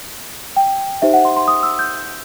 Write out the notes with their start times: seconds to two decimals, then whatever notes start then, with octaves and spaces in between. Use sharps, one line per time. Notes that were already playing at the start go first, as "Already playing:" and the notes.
0.56 G5
1.02 D#4 G4 C5 E5
1.13 F#5
1.25 C6
1.37 C6
1.48 D#6
1.63 E6
1.79 G6